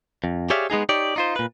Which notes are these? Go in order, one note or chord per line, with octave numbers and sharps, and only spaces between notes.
F2
G4 G#4 C#5 D5 E5 F5
G#3 B3 D#4 G#4
D#4 G4 C#5 D5
D#4 F4 C5
A#2 B4